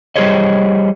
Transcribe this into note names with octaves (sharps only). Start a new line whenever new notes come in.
G3 G4 G#4 C5 C#5 D#5